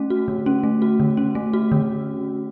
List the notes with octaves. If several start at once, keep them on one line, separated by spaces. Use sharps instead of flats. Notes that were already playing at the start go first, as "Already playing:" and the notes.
Already playing: A3 C#4
F#4
D3
C#4
A3
F#4
D3
C#4
A3
F#4
D3